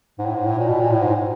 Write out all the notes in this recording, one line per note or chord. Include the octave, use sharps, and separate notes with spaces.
G#2
A2
G#2
A2
A#2
B2
A#2
A2
G#2